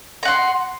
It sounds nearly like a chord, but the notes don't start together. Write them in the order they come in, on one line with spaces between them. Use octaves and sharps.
A#5 F#5 C6